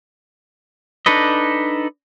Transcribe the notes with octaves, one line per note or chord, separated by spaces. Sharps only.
D4 D#4 A4 B4 D#5